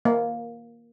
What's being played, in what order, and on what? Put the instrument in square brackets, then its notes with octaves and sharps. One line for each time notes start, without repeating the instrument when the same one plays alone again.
[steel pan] A#3